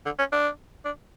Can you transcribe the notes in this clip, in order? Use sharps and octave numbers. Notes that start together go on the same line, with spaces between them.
D3
C#4
D4
D4